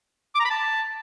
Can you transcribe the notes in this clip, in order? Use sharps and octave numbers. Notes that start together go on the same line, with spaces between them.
D6
A#5
B5
A5